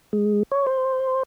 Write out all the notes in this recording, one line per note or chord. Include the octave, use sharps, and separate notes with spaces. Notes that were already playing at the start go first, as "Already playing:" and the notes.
G#3
C#5
C5